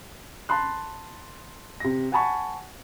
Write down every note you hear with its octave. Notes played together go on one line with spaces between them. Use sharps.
A5 B5 C6 F#6
C3 A#6
F#5 G#5 A5 B5 C#6